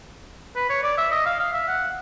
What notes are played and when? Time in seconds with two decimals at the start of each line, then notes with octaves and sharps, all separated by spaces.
0.56 B4
0.69 C#5
0.83 D5
0.97 E5
1.11 D#5
1.26 F5
1.39 F5
1.53 E5
1.68 F#5